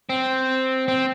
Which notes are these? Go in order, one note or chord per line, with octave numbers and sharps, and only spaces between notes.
C4
C4